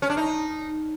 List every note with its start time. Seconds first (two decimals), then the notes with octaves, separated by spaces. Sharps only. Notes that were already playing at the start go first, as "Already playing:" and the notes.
0.02 C#4
0.10 D4
0.17 D#4